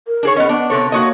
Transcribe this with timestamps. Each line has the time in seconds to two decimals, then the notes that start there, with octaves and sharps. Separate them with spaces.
0.07 A#4
0.23 D4 G#4 C#5
0.36 B3 C#4 D#5
0.49 B3 D4
0.70 C3 A4 C#5
0.92 A#3 F#4 C#5 D#5